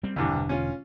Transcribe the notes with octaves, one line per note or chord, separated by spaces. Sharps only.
G3 C4
E1 C2 G2 D3 E3
C#4 F4